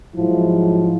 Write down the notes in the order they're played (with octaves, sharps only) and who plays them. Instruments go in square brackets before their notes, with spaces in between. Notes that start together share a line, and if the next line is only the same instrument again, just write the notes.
[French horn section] G#2 F3 F#3 E4